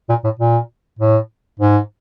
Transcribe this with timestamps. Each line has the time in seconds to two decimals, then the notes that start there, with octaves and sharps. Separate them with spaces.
0.09 A#2
0.24 A2
0.39 A#2
0.99 A2
1.60 G#2